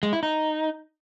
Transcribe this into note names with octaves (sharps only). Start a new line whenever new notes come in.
G#3
E4
D#4